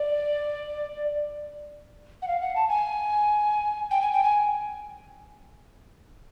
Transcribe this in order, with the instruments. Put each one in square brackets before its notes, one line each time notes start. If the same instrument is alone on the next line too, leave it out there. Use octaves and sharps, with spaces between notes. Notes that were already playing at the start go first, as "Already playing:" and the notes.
Already playing: [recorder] D5
F#5
F5
F#5
A5
G#5
G5
G#5
G5
G#5